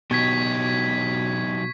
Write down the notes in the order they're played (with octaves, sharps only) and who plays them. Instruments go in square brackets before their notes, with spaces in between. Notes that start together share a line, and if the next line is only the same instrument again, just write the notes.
[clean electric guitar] B2 [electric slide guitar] F#3 D#4 G4 [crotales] C#6 G#6 B6